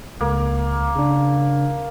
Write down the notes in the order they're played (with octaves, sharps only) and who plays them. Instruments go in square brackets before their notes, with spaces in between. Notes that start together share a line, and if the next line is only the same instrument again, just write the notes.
[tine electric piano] C#2 [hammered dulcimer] A#3
[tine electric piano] C#3 D4